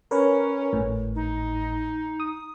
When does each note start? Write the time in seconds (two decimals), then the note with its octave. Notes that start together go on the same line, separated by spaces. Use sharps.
0.11 C#4 A#4 B4 C#5
0.73 G#1 A2
1.15 D#4
2.20 D#6